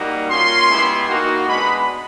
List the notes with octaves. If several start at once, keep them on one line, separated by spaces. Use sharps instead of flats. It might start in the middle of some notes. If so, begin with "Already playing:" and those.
Already playing: G3 A#3 D#4 F#4
A#3 C#4 F4 C6
G#3 B3 E4 G4
A#3 D#4 F#4
G#3 B3 D4 B5